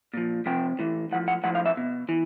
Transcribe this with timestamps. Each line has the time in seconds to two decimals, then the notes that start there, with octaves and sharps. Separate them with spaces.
0.14 A#2 F3
0.46 C3 F3 G5
0.79 A2 E3
1.11 A2 F3 F#5
1.28 F#5
1.43 A2 F3 F#5
1.55 F5
1.66 E5
1.77 B2
2.09 E3